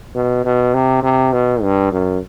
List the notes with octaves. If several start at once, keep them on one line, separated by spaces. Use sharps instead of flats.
B2
B2
C3
C3
B2
G2
F#2